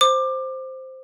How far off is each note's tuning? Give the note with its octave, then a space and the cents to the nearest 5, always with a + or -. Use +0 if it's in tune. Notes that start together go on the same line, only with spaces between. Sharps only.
C5 +0 D6 +20